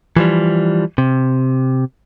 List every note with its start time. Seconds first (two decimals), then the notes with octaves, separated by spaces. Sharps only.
0.17 E3 F3 G3
0.98 C3